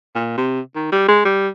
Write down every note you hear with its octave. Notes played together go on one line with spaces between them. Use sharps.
A#2
C3
D#3
G3
G#3
G3